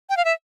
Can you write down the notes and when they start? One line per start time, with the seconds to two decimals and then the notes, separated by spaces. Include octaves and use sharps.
0.10 G5
0.17 F5
0.25 E5